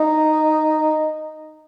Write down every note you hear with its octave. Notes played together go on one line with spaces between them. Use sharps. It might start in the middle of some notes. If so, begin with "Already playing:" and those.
Already playing: D#4